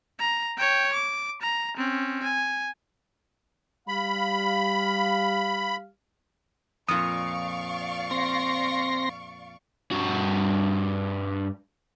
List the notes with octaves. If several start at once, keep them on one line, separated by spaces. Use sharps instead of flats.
A#5
C#5 G5
D6
A#5
C4 C#4
G#5
G3 F5 B5
F2 A#2 D5 F5 C#6 D#6
C4 C6 A#6
G2 F#4